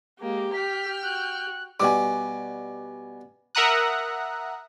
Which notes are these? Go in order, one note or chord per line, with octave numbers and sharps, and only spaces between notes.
G#3 A#3 G4
G5 F6 G6 B6
F#4 F#6
B2 G3 G#5 D6
A#4 E5 F#5 A#5 D#6 F#6